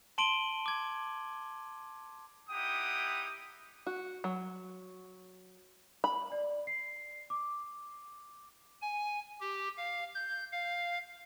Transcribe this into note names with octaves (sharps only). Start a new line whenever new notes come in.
A5 C6 D7 D#7 F#7 G7
D6 G#6
D#4 E4 G4 F#5 G5 D#6
F#4
F#3
B5
D5
C7
D6
G#5
G4
F5
G6
F5